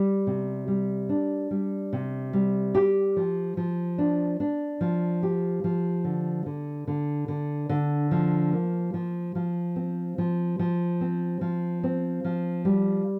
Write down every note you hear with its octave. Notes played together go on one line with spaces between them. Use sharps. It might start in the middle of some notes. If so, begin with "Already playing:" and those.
Already playing: G3
C3
G3
D4
G3
C3
G3
G4
F3
F3
D4
D4
F3
G4
F3
D3
D3
D3
D3
D3
F3
A#3
F3
F3
C4
F3
F3
C4
F3
C4
F3
G3